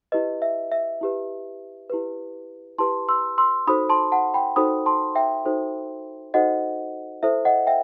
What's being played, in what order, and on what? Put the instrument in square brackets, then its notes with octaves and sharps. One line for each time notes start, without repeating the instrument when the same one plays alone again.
[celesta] E4 G4 B4 D#5
E5
E5
E4 G4 B4
E4 G4 B4
E4 G4 B4 A5 C6
C6 E6
C6 E6
D#4 F#4 A4 C5 B5 D#6
A5 C6
F#5 A5
G5 B5
D#4 F#4 A4 C5 B5 D#6
A5 C6
E5 G5
D#4 F#4 A4 C5
D#4 F#4 A4 C5 D#5 F#5
E4 A4 C5 E5
D#5 F#5
E5 G5